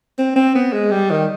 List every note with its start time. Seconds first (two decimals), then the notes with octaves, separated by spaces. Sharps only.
0.18 C4
0.36 C4
0.55 B3
0.73 G#3
0.91 G3
1.11 D#3